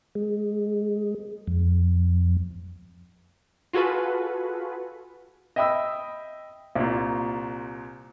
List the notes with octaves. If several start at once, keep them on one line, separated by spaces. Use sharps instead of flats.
G#3
F2
F4 F#4 G#4 A4 B4
D#5 E5 G5 B5 D#6 E6
C2 A#2